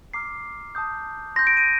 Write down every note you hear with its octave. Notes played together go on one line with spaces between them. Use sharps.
A#5 D6 F6 C7
A5 D#6 G6
C6 G6 A#6
D7
D#7